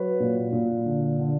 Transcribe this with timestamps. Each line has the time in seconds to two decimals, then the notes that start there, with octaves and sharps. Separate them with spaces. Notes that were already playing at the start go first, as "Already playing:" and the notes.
Already playing: F#3 B4 C#5
0.20 A#2
0.52 A#2
0.86 D3
1.19 D3